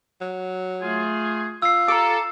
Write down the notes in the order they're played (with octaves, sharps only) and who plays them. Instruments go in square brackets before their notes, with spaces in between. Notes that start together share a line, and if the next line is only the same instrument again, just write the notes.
[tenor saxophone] F#3
[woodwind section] A3 F4 G#4
[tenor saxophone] F4 [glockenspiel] E6 C7
[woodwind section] A4 [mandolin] A#5 D6